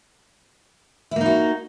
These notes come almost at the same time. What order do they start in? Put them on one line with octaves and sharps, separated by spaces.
E4 A#3 D#4 F#4